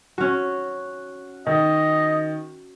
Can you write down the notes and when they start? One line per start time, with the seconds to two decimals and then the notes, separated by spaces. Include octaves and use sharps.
0.18 C#4 F#4
1.46 D#3 D#5